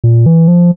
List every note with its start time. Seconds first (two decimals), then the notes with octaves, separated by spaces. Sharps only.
0.04 A#2
0.26 E3
0.48 F3